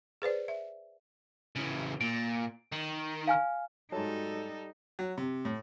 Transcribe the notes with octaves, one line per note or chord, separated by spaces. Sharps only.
G#4 B4 C5 D5
E5
C#3 E3
A#2 D7
D#3
F5 G#5 F6
G#2 F#3 G3 D#4 A4 A5
F#3
C3
A2